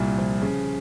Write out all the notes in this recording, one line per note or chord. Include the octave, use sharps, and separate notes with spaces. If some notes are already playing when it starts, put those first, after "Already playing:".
Already playing: C2 A#2
F3
C#3